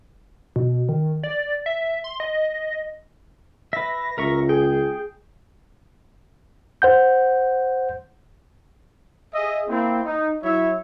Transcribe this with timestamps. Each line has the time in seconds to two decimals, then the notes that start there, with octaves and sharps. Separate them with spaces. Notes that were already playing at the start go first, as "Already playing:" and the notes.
0.56 B2
0.89 D#3
1.23 D5
1.66 E5
2.04 C6
2.20 D#5
3.73 B4 E5 A#6
4.18 C#2 A#4 E5 C#6
4.49 G#4 G5
6.82 C5 F#5 G6
9.34 G#4 D#5 E5
9.69 A#3 C4 E4
10.05 D#4
10.43 F#3 E4 C#5 E5